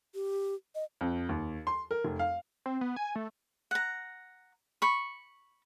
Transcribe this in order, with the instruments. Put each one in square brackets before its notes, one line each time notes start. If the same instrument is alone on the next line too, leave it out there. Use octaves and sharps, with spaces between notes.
[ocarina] G4
D#5
[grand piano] F2
D#2
C6
A#4
F1
F5
[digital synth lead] C4
B3
G#5
A3
[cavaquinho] F#5 A#5
B5 C#6